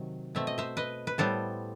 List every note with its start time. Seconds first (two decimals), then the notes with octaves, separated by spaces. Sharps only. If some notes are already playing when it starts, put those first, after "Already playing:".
Already playing: C3 D#3 F#3
0.35 B2 A3 C4 E5
0.47 D#5
0.58 C5 E5
0.77 B4 D#5
1.07 B4
1.18 A2 G3 B3 A4 C5